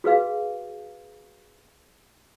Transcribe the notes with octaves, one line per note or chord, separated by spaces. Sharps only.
F#4 G#4 B4 F5